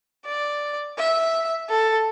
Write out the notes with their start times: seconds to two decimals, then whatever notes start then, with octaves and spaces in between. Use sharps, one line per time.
0.26 D5
0.98 E5
1.69 A4